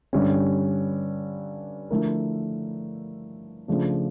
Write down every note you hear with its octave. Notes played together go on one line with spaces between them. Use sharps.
G2 D3 G3 C#4
D3 F3 A3 E4 A#4
C#3 F3 A3 D4